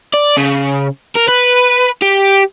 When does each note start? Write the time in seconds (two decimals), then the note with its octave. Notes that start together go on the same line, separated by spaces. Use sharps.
0.13 D5
0.37 C#3
1.16 A#4
1.29 B4
2.02 G4